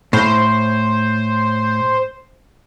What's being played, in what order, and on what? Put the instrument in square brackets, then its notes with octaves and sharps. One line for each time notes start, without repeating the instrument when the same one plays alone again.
[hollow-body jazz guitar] A2 [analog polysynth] C5